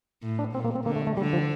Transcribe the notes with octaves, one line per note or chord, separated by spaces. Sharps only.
A2
D4
A#2 C4
A#3
C4
D3 A#3
A3
A3
D3 G3
F3